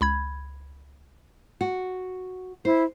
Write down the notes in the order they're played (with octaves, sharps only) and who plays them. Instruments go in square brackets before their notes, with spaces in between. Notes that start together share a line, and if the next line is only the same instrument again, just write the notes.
[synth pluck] C#2 B5 G#6
[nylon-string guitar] F#4
[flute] E4 [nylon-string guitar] C5